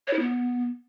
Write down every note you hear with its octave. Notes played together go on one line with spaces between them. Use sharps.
C#5
E4
B3